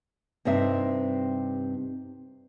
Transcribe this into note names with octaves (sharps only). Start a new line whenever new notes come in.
G2 C3 C4 D#4 C5 E5